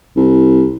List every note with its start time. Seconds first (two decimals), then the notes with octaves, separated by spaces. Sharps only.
0.17 C2